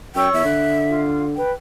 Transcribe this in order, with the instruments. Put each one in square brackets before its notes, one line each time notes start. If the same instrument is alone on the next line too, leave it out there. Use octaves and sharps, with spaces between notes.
[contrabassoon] F#2 [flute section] C#5 C#6 E6 [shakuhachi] G5
[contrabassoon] E2 [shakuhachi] E5
[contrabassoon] D3 [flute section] F#6
[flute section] F4
[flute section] B4 [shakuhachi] G5